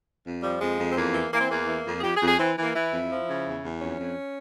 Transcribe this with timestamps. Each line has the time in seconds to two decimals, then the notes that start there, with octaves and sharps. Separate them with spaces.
0.25 F2
0.42 F3 G3
0.61 F2 G#3
0.79 F2
0.90 C4
0.95 E2 A#3
1.14 E3
1.32 E3 A#3
1.40 C4
1.49 E2 A#3
1.67 E3
1.85 F2
1.98 G#4
2.03 F2 G4
2.15 G#4
2.21 F2
2.27 G#4
2.38 E3 C4
2.56 E3
2.61 A#3
2.74 E3 E4
2.92 F2
3.10 F3
3.27 C#3
3.45 E2
3.62 E2
3.80 F2 C#4
3.98 F2